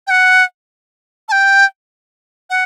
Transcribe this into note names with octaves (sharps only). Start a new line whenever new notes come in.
G5
F#5
A5
G5
F#5